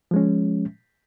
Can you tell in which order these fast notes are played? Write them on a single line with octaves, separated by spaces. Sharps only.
F3 G#3 C#4